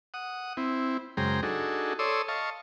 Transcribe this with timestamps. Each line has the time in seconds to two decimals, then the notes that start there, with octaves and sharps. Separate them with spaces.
0.14 F#5 D#6
0.57 C4 E4
1.17 F#2 C#3 G#3 C5 G5 A#5
1.43 D4 D#4 F#4 G#4 A4
1.99 A4 C#5 D5 C6 D#6 E6
2.28 D#5 F5 A5 C#6